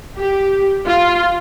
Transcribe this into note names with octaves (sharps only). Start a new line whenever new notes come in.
G4
F4